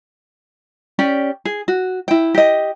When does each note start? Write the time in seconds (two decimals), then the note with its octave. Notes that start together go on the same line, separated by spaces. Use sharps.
0.99 C#4 G4 D5 G5
1.45 G#4
1.68 F#4
2.08 E4 G5
2.34 G4 D#5